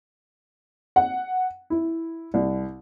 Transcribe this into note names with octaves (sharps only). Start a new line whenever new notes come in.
F#5
E4
C2